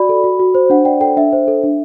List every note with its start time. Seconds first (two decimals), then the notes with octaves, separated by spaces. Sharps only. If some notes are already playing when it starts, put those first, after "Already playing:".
Already playing: F#4 D5 B5
0.09 A4
0.24 F#4
0.40 F#4
0.55 C5
0.70 D4 F#5
0.85 D5 G5
1.01 A4 G5
1.17 D4 E5
1.33 C5
1.48 A4
1.63 D4